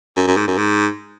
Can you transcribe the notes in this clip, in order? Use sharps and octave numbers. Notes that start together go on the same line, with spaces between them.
F#2
F#2
G#2
F#2
G#2